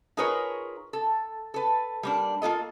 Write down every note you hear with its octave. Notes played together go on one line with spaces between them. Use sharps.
D#4 F4 G#4 A#4 B4 C#5
A4
A4 B4
G3 A#3 D4
A#3 F4 A4 D#5